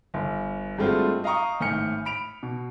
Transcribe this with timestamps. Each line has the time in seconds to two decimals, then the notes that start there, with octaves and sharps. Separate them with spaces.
0.14 G1
0.78 G2 G#3 A3 C4 F4 F#4
1.24 D#5 F5 G5 A#5 C#6 D#6
1.60 G#1 A2 G#5 F6 G6 C#7
2.05 B5 D7 F7
2.43 B2